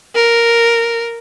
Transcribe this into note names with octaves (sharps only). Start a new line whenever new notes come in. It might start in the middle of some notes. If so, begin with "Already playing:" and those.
A#4